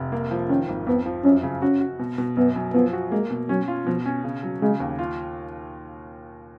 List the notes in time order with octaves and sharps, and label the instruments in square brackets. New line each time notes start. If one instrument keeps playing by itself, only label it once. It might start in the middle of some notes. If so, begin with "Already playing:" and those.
Already playing: [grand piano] F1
A#3
F3
[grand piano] D#3 [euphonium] C#4
[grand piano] G#1
[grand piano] F2 [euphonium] B3
[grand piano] F3
[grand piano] F#2 [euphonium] C#4
[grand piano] C#3
[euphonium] C#4 [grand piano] F#4
[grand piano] F#4
B2
B2
[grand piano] F#2 [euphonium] B3
[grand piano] F#2
[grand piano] F3 [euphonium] B3
[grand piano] F#4
[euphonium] G#3 [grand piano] A#3
[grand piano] B2
[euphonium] F#3 [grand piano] C#4
[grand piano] F4
[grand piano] B2 [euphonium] F3
[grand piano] C#4
C#3
F#3
[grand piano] C#3 [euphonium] G#3
[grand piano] D#2
F4